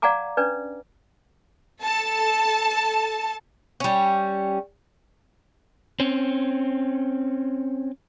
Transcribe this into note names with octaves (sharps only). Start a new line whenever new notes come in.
D5 F5 F#5 G#5 A#5 D6
C#4 D4 B4 D5
A4 A5
G3 C#4
C4 C#4